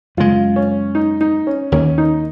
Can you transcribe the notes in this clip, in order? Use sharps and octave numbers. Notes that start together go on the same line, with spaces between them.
F#2 C#3 G#3 F4
C#4
D#4
D#4
C#4
D#2 D#3 A#3 C#4
D#4